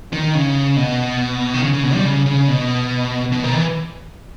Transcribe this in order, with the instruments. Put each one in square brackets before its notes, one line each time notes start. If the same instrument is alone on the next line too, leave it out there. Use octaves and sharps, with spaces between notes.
[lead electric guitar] D#3
C#3
B2
D#3
C#3
C#3
B2
G3
C#3
C#3
B2
B2
D#3
E3